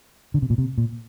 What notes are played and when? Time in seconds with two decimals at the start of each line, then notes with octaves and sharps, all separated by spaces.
0.34 D3
0.42 C3
0.50 A#2
0.58 C3
0.78 A#2